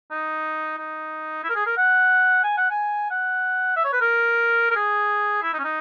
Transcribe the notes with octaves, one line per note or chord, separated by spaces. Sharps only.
D#4
D#4
E4
A#4
G#4
A#4
F#5
G#5
F#5
G#5
F#5
E5
C#5
B4
A#4
A#4
G#4
E4
D#4
C#4
D#4